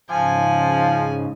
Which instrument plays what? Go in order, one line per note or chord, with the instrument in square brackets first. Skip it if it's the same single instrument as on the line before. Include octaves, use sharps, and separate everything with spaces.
[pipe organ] G#2 C#3 [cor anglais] F3 [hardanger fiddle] G#5